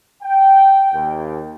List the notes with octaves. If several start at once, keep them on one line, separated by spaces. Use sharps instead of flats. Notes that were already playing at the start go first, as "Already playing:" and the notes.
G5
D#2